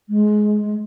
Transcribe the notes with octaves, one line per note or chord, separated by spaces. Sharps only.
G#3